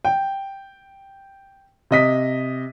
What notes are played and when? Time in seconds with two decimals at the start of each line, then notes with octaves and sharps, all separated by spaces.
0.05 G5
1.91 C3 D#5 B6